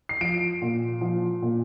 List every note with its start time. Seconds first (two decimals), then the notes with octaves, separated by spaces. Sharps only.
0.09 C7
0.21 F3 D7
0.62 A#2
1.01 F3
1.42 A#2